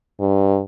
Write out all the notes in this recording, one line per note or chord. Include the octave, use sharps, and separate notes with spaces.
G2